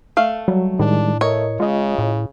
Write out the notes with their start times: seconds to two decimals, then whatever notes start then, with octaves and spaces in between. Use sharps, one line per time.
0.17 A3 F5
0.48 F#3 G3
0.79 A2 D#3 G3 G#3 D4
1.21 A3 A#4 C#5 D#5
1.60 C#3 G#3 F4 D#5
1.98 A2